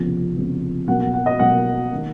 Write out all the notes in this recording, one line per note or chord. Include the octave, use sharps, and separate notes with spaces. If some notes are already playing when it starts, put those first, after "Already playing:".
Already playing: F1 F2 C#3 F3 B3
F1 F2 C#3 F3 B3
B1 B2 A#3 F#5
F#5
F#5
D#5
B1 B2 A#3 F#5
D#3 A#3